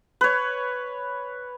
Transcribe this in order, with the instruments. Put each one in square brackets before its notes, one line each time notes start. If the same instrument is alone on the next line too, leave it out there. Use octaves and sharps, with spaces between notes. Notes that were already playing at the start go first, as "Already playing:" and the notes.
[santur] B4 C#5